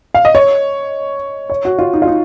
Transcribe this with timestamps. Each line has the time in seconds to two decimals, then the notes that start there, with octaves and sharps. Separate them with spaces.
0.15 F5
0.25 D#5
0.35 C#5
1.50 C#5
1.65 F#4
1.79 F4
1.93 D#4
2.02 F4
2.07 D#4